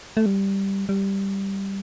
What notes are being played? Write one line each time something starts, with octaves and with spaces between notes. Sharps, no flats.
A3
G3
G3